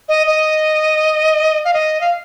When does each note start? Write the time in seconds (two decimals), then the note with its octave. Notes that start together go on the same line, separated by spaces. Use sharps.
0.09 D#5
0.27 D#5
1.65 F5
1.73 D#5
2.01 F5